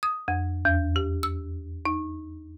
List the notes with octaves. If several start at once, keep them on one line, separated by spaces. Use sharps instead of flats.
D#6
F2
E2
G4
E6
D#4